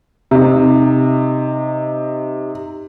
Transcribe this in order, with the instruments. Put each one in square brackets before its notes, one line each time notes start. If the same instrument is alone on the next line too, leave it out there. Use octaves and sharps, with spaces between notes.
[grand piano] C3 D#4